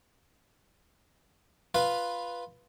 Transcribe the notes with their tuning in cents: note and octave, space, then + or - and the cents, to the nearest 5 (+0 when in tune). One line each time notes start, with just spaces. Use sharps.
F4 +0 B4 -5 F5 +0